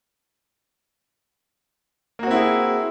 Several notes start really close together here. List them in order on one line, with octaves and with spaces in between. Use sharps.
A#3 F#4 C4 E4 G#4